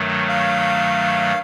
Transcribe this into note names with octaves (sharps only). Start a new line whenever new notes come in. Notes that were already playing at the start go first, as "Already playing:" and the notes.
Already playing: G2 D#3 F#3 A3
F5